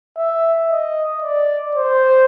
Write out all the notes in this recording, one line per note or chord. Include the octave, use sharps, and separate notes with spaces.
E5
D#5
D5
C5